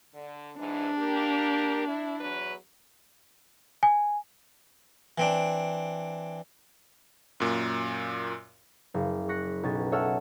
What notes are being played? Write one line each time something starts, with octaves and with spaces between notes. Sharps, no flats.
D3
G#2 E3 D4
A#3 G4 A#4
E4
E2 F#3 B4
G#5
E3 C4 D4
F#2 A#2
F#1
C#6 F#6 A#6 B6 C#7
B1 C#4 A6
A4 C#5 E5 F#5 E6 F6